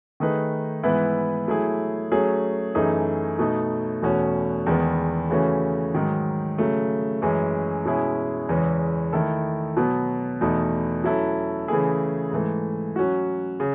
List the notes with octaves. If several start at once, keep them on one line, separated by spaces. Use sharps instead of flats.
D#3 A3 D#4 G#4 B4
G#2 E3 B3 E4 B4
F#3 A3 E4 G#4
F#3 A3 C#4 G#4
F#2 E3 A3 D#4 G#4
B2 A3 D#4
E2 B2 A3 C#4 F#4
E2 D#3 G#3 B3
C#3 E3 A3 C#4 F#4
G#2 D#3 F#3
C#3 F#3 A3
F#2 E3 G#3 C#4
B2 G#3 C#4 E4 G#4
E2 C#3 E3 G#3 C#4
D#3 A3 E4 A4
B2 F#3 B3
E2 B2 A3 D#4
F#3 C#4 E4 A4
C#3 E3 A3 E4 G#4
G#2 E3 A3
F#3 C#4 F#4
C#3